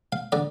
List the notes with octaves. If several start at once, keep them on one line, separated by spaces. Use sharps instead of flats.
F5
D3 D5